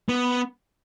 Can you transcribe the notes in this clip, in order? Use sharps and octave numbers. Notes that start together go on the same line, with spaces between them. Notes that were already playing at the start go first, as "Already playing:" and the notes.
B3